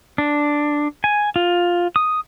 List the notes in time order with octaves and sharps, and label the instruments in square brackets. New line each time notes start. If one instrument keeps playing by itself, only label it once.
[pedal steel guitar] D4
G#5
F4
D#6